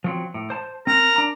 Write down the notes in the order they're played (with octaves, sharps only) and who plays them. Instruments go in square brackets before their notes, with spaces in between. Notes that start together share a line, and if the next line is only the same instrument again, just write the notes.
[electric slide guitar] F3 F#3 C4
A2
C5 A5
[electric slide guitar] C4 [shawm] A#4
[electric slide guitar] D4 A#5